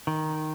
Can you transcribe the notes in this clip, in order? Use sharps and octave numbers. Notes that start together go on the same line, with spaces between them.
D#3